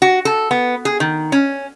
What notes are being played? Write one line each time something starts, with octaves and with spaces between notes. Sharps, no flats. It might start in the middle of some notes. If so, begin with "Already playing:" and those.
F#4
A4
B3
G#4
D#3
C#4